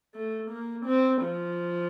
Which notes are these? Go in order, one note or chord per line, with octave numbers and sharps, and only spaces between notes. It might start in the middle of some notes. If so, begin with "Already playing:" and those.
A3
A#3
C4
F3